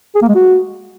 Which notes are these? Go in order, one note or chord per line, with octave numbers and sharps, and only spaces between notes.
G#4
A#3
G#3
F#4